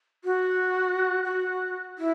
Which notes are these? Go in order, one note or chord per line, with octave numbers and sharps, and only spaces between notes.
F#4
F#4
E4